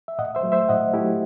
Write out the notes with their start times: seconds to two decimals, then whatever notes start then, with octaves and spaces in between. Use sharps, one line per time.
0.08 E5
0.18 A2 D#5 F#5
0.35 C5 E5
0.43 F#3 A3
0.52 C5 E5
0.69 A2 D#5 F#5
0.93 A3 E4 G4
0.98 F#3